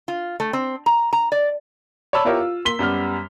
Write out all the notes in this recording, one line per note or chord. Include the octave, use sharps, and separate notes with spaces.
F4
A3
C4
A#5
A#5
D5
C#5 D5 A5 B5 E6
B3 E4 F4 G4 A#4 C#5
F4
A#3 C6 B6 G7
F#2 G3 B3 F6